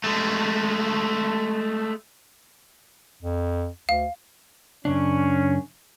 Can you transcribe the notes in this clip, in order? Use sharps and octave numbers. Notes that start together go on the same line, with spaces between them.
G#3 A3
F2
D2 F5
F#2 C#3 C#4 D4